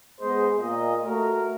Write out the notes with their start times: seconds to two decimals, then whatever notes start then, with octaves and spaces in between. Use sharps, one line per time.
0.21 G#3 B3 G#4 C5 D#5
0.58 A#2 D#5
1.04 A3 F#4 A#4